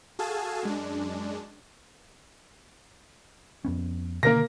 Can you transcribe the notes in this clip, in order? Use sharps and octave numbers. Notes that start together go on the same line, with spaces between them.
F#4 G#4 A4 F5 G#5 A5
F#2 G#3 D4
F2 B3 C#4
B2 D3 D#3 A#3 A#4 A#6